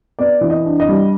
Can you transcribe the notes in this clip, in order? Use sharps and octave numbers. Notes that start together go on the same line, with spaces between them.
B3 D5
E3
D#5
D4
D#5
G3